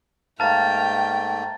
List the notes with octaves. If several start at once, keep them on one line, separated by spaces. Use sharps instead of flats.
G#2 A3 A#3 F5 G5 A5 A6